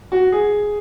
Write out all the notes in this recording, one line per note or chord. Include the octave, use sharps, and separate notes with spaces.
F#4
G#4